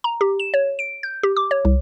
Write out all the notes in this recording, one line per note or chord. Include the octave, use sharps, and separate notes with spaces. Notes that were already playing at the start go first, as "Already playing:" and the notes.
A#5
G4
E7
C#5
D7
G6
G4
D6
C#5
C2